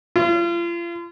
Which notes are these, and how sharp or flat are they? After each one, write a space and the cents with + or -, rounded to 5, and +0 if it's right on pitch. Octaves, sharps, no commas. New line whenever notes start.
F4 -35